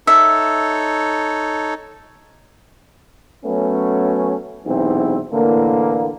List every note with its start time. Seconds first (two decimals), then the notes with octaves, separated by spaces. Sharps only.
0.07 D#4 A4 C#5 E5
3.45 F#3 A3 B3 C#4
4.66 B1 E2 G#2 C3 C4 E4
5.32 A2 D3 E3 A#3